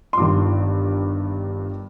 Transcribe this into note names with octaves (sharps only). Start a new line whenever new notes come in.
C6
G1 G2 D#3 D6